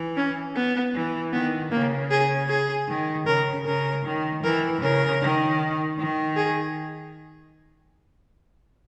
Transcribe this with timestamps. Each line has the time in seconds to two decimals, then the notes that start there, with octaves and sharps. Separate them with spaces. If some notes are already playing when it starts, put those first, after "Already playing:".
Already playing: E3
0.17 C#4
0.56 B3
0.94 E3
1.33 D#3 B3
1.71 C#3 A#3
2.11 G#4
2.49 G#4
2.88 D#3
3.26 C#3 A#4
3.65 C#3 A#4
4.05 D#3
4.43 E3 A#4
4.82 C#3 A#4
5.21 D#3
5.98 D#3
6.37 G#4